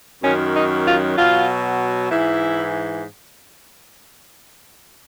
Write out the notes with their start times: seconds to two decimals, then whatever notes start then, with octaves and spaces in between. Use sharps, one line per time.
0.22 F#2 D#3 F#3 C#4
0.54 D#4
0.85 F4
1.16 B2 F#3 F4
2.10 G#2 E3 E4